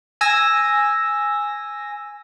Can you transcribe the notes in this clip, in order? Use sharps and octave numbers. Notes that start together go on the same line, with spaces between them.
G#5 E6 A#6